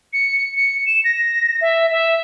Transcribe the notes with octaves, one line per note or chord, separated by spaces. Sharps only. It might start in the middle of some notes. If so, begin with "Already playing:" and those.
C#7
C#7
E7
A#6
E5
E5